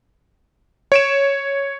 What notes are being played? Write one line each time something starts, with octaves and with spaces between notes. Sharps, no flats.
C#5 D7 E7